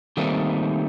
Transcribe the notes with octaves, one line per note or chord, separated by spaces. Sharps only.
D#3 G3 A3 A#3 C4 D#4